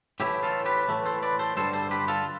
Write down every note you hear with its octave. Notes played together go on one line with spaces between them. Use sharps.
A2 E3 A3 E4 G4
F4 A4
G4 B4
A2 E3 A3
A4 C5
B4 D5
A4 C5
G2 D3 G3 A4 C5
A4 C5
G4 B4
F4 A4